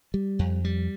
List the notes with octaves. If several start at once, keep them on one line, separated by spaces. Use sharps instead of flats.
G3
F2
G3